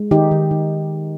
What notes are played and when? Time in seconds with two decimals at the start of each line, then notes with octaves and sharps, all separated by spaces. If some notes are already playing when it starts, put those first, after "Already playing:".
Already playing: G#3
0.11 D#3 D#4 G4
0.31 D#3
0.51 D#3